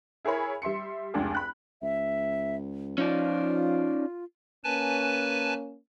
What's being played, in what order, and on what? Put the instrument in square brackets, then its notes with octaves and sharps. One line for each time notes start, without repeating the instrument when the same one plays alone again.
[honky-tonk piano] E4 G#4 A#4 C#5 B5
G3 E5 C6 C#7
F1 C#2 D4 G#4
B5 F#6
[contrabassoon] C#2 [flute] E5
[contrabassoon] F3 [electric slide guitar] C#4 D#4 D5 [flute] F4
[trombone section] A#3 C#4 [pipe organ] B4 G#5 A5